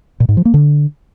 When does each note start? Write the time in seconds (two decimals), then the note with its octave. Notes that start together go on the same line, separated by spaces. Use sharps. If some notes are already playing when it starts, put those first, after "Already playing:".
0.20 A#2
0.29 G#2
0.37 F3
0.45 A#3
0.54 D3